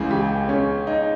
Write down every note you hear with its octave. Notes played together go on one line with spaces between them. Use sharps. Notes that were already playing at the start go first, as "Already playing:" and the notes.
Already playing: C#2 C#3 E3 G#4
G4
C#4
D#4